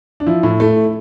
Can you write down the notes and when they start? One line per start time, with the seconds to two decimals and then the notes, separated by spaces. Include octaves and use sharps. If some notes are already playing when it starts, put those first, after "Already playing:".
0.20 D4
0.26 F3 E4
0.43 A2
0.60 A3